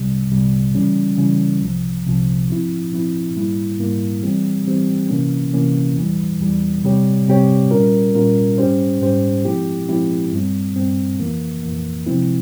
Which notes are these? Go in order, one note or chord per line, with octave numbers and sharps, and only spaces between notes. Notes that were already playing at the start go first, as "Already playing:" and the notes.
Already playing: C2 C3 G3
C2 C3 G3
C#3 E3 G3 C#4
C#3 E3 G3 C#4
C2 C3 F3
C2 C3 F3
F3 C4 E4
F3 C4 E4
G#2 G3 A#3 E4
G#2 G3 A#3 E4
E3 G3 C4 G4
E3 G3 C4 G4
C3 E3 A#3 C#4
C3 E3 A#3 C#4
E2 E3 G3
E2 E3 G3
C3 G3 C4 G4 C#5
C3 G3 C4 G4 C#5
A#2 G3 C#4 F4 A#4
A#2 G3 C#4 F4 A#4
G#2 G3 C#4 G4 C5
G#2 G3 C#4 G4 C5
F3 G#3 C4 E4 G4
F3 G#3 C4 E4 G4
G2 G3 C4
G2 G3 C4
F2 E3 A#3
F2 E3 A#3
C3 F3 G#3 C4 E4